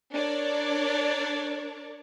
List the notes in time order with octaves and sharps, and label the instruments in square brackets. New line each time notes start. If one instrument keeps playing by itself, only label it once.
[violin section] D4 A#4 C#5 D5